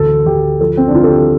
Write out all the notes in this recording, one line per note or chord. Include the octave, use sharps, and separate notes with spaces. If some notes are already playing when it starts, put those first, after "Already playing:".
Already playing: A1 D2 A4
D2 G4
F3 A4
C4
D4
D2 F4
A4
G4